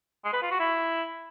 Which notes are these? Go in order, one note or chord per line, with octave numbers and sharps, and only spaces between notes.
G#3
B4
F4
F#4
E4